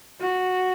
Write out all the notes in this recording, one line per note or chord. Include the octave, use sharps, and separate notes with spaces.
F#4